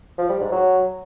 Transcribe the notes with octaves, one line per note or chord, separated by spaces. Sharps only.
F3
G3
G#2
F#3